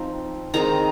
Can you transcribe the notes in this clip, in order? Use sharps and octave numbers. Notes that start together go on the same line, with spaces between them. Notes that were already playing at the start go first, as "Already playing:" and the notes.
Already playing: F3 C4 D#4 C6
D#3 G#3 C4 D#4 A#5